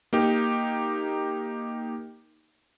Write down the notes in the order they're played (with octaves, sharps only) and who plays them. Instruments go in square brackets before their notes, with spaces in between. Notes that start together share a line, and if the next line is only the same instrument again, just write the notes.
[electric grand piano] A#3 D#4 G4